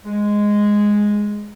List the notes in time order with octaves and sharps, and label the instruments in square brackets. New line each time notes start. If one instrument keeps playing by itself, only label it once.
[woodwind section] G#3